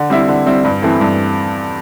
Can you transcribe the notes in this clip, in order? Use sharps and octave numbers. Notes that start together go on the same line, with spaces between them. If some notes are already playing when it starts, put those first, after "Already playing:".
Already playing: D3
G3 C4 E4
D3
G3 C4 E4
G2
E3 A3 C4
G2